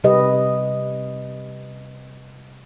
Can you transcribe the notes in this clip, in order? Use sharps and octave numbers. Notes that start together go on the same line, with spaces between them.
C3 G3 G4 B4 D#5